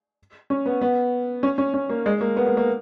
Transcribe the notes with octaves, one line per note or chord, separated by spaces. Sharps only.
C#4
B3
B3
C#4
C#4
C#4
A#3
G#3
A#3
B3
A#3
A#3